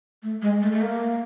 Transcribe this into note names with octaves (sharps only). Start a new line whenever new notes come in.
A3
G#3
A3
A3
A#3